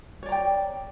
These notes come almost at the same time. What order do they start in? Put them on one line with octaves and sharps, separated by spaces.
C#5 D5 A#5 G5